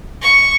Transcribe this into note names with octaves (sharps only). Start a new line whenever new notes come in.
C#6